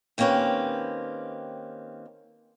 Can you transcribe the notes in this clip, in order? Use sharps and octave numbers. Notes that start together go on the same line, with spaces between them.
D#3 A#3 C4 C#4 G4 B4